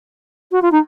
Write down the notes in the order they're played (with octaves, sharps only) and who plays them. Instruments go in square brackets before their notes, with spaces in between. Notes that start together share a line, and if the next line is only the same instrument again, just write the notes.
[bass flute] F#4
F4
D#4